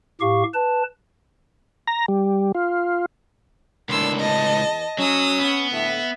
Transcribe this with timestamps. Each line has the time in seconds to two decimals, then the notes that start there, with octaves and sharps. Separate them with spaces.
0.21 A2 G4 F5 C#6
0.54 B4 A5
1.88 A#5
2.08 G3
2.55 F4
3.89 C#2 A2 D#3 A#3 D4 C6 E6
4.20 D#5 A5
4.58 E2
4.99 F#3 C#4 D#6 E6
5.39 B3
5.71 A2 D3 E5